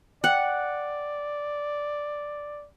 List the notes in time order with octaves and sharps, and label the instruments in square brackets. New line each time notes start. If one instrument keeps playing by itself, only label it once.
[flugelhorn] D5 [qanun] F#5 [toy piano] G5